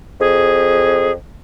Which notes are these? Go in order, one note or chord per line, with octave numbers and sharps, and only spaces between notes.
F2 G#4